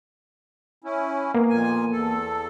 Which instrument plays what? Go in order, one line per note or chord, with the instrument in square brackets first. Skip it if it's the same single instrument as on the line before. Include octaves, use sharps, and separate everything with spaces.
[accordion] C#4 E4
[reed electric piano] A#3 B3
[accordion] F2 A#2 G#5
E2 A4